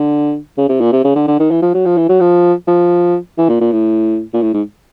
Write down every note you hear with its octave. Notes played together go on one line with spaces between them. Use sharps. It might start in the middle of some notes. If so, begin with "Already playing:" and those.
Already playing: D3
C#3
C3
A#2
C3
C#3
D3
D3
D#3
E3
F3
F#3
F3
E3
F#3
F3
F3
E3
A#2
A#2
A2
A#2
A2
G#2